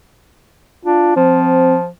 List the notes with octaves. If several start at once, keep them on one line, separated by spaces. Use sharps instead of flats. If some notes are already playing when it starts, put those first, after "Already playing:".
D4 F4
F3 C4